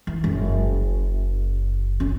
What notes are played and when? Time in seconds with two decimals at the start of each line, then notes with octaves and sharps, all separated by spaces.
0.07 E3
0.24 F#1
2.00 C#4